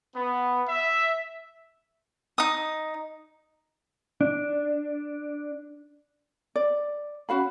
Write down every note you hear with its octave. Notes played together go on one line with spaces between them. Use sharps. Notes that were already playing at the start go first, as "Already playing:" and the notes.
B3
E5
D#4 D#6
D4
D5
C#4 F#4 F5 B5